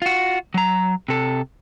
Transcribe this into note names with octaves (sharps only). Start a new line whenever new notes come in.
F4 F#4
F#3 A#5
C3 A4